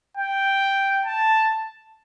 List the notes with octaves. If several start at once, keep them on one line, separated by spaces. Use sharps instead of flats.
G5
A5